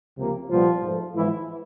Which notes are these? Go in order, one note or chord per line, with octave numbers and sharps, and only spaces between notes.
C#2 C3 F3 A#3
C2 A#2 F3 G3 B3 F4
G#2 F3 A3
G#2 E3 F3 G#3 B3 E4